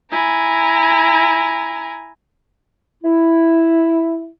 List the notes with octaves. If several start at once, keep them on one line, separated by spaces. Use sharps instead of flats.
E4 G#5 A#5
E4